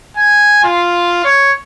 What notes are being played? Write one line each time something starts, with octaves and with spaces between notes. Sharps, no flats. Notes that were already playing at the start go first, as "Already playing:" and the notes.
G#5
F4
C#5